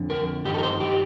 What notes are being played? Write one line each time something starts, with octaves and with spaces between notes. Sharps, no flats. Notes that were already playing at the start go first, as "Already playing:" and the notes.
Already playing: F2 D3
A#4
G2 D#3 G4
A4
A#4
C5
G4